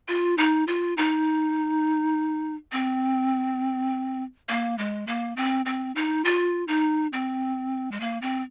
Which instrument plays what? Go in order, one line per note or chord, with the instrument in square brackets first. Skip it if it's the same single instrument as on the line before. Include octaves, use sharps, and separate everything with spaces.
[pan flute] F4
D#4
F4
D#4
C4
A#3
G#3
A#3
C4
C4
D#4
F4
D#4
C4
G#3
A#3
C4